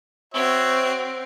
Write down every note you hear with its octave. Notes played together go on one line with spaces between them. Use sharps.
C4 F#4 C#5 E5